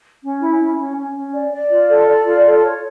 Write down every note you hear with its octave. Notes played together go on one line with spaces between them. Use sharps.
C#4
E4
C#4
C#4
C#4
C#4
D5
D5
F4
A4
D5
F4
A4
C#5